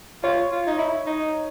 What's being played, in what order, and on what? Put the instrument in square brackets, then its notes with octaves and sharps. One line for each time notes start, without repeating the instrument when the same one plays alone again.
[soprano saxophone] F4 [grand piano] C#5
[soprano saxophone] F4
D#4
E4
D#4